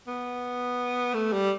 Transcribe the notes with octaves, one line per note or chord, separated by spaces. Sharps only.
B3
A3
G3